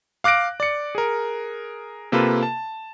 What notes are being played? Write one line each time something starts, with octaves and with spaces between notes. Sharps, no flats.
F5 D6 F#6 A#6 D7
D5 C#7
G#4 A#4
C3 A#3 F4 A4 B4
A5